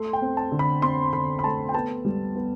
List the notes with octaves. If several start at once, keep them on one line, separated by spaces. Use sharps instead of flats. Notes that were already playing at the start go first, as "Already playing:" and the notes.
Already playing: A3 C6
G5
C4
A5
D3
B5
C4 C6
D3 B5
B5
A3 A5
G5
B3 A5
G3
B3